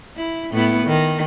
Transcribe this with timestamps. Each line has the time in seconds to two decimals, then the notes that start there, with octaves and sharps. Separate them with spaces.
0.16 E4
0.51 A2 B3 E4
0.86 D#3